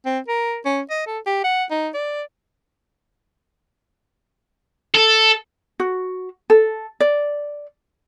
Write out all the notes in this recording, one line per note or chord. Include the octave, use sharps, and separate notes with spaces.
C4
A#4
C#4
D#5
A4
G4
F#5
D#4
D5
A4
F#4
A4
D5